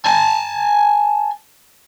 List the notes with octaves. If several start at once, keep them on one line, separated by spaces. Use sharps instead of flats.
G#5 A5